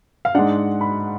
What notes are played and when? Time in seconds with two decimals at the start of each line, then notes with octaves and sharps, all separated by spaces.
0.25 F5
0.35 G#2 G#3 D4 F#5
0.81 B5